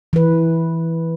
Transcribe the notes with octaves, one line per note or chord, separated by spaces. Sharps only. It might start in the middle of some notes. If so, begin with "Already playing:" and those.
E3 B4